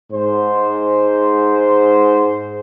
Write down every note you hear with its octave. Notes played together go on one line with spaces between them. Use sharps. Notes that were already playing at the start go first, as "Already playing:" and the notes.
G#2 C5